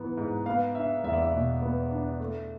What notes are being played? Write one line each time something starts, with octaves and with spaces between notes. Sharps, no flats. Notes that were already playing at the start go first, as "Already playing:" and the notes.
Already playing: G#2 E3 B3
G#2
B3 F5
D4 E5
E2 E5
D5
E5
B2
B3
D4
A3